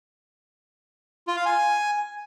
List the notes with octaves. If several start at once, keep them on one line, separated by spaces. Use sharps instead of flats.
F4
F5
G#5